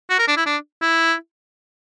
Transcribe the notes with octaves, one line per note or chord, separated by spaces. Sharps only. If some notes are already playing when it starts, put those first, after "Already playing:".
F#4
A#4
D4
E4
D4
E4